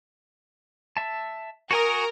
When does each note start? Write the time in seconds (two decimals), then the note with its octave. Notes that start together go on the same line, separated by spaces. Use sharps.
0.97 E5 A5
1.71 F#4 A#4 G#5 D#6